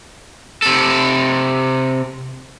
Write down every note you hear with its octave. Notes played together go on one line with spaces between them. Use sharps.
C3 A4